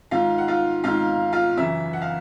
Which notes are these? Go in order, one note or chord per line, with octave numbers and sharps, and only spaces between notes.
G#2 D#3 F4 F5
F#5
F4 F5
G#2 D#3 F4 F5
F4 F5
F#2 C#3 E3 E4 E5
F#5
F5